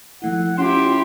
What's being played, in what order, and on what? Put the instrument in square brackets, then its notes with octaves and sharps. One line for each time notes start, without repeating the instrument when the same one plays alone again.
[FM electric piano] F3 A3 E4 [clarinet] F#5
[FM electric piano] C#4 [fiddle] E4 G4 [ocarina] F4 [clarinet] C6